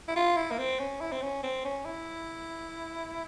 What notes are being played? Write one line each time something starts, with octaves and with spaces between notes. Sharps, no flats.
E4
F4
E4
A#3
C4
C#4
E4
C4
C#4
C4
C#4
E4